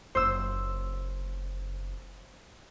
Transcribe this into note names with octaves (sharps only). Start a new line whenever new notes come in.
F#1 A#3 C5 E6